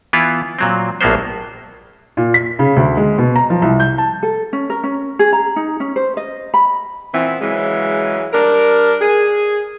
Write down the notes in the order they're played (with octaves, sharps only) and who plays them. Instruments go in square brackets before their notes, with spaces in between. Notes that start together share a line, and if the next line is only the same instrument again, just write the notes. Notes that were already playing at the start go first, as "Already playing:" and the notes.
[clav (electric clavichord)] E3 B3 E4 F4
A#2 F#3 C4
A#1 A2 F#3 A#3 B3 C5
[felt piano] A#2
B6
C#3
D2
G#3
B2
A#5
F3
C2
G6
A5
[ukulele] A4
C#4
A#4
C#4
G#4
A#5
D#4
C#4
C5
D#5
B5
[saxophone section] A#2 E3 B3 C4
C#3 E3 F#3 G#3
G3 D4 A#4
G#4